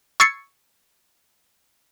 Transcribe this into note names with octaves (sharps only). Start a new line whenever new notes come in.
C#6 E6 G#6 A6 C7 C#7